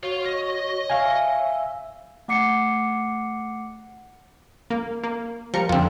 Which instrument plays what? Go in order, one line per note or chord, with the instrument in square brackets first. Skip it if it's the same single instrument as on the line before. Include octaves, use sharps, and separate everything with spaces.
[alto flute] F#4 [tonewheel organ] C#5 [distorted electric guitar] F5 C6
[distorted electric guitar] D#5
[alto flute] E5 [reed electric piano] F5 G#5
[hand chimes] A3 F#5 D6 C7 C#7
[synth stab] A#3
A#3
[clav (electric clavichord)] F3 [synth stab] G3 A#4 C#7
[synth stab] F2 D3 [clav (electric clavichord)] C4 F4